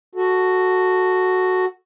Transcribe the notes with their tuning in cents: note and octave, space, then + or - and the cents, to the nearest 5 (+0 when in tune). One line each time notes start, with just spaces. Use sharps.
F#4 +0 A4 +0